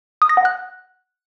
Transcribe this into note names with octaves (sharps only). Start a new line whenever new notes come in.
D#6
A#6
F#5
F#6